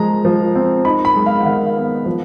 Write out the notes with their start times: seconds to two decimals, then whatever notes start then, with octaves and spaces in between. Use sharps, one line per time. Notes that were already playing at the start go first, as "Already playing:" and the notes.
Already playing: F3 G#3 A#5
0.25 F3
0.55 C4
0.85 D#4 B5
1.05 B5
1.16 G#3
1.26 F5
1.41 F#5
1.45 D#3 F5
1.76 B3
2.06 F3